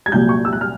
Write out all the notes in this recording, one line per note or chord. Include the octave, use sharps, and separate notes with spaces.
G#6
C2 A#2 F#3 G6
C#6
E6
F#6
F6